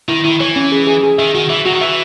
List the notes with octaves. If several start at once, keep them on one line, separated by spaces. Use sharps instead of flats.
D#3 E4
D#3 E4
E3 C#5
C#4
G#4
G#4
G#4
D#3 E5
D#3 F#4
E3 E5
F#3 F#4
D#3
E3 E5